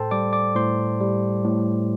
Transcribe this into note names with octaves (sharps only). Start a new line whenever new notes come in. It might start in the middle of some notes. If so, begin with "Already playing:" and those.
Already playing: A2 A4 C5 G5 A5 C6
G3 D5 D6
D5 D6
A2 C5 C6
G3
A2